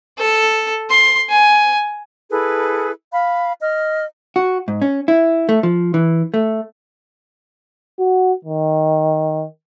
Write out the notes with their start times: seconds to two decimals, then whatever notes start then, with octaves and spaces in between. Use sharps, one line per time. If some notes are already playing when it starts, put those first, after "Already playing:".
0.18 A4
0.90 C6
1.29 G#5
2.31 E4 G#4 A4 B4
3.13 F5 B5
3.61 D#5 F6
4.36 F#4
4.68 G#2
4.82 C#4
5.08 E4
5.49 A3
5.63 F3
5.94 E3
6.34 A3
7.99 F#4
8.45 D#3